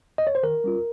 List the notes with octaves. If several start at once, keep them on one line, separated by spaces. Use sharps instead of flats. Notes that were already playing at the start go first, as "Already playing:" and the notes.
D#5
C#5
C5
D#3 A#4
G3 C#4 F4